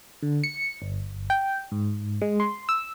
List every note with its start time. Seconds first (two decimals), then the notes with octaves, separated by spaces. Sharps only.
0.22 D3
0.44 C#7
0.82 G1
1.30 G5
1.72 G#2
2.22 G#3
2.40 C6
2.69 E6